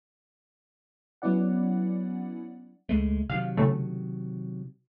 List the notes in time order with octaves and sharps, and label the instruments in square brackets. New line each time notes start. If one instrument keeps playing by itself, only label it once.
[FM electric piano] F#3 B3 C#4 E4 D5 F#5
[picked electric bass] C#2 G#3 A3
[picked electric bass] C3 D#3 F#3 [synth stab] F5
[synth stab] A2 C#3 A3